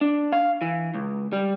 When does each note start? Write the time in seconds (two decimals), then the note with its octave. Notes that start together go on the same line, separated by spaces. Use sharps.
0.01 D4
0.32 F5
0.62 E3
0.94 C#2
1.33 G3